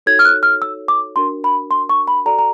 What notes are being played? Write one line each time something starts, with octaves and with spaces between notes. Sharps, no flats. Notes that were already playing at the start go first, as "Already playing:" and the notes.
D#4 F#4 A4 C#5 G#6
F6
F#6
F6
E6
D6
D4 F#4 A#4 C6
B5
C6
C#6
B5
F#4 A4 D5 A#5
A#5